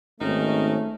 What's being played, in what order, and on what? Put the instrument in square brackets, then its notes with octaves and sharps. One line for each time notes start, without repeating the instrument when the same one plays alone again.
[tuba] G#1 [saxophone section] D#3 D#4 [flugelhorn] A3 [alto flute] C#4